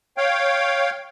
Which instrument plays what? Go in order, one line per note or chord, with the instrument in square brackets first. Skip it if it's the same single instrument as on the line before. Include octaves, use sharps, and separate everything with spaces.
[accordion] C#5 F5 G5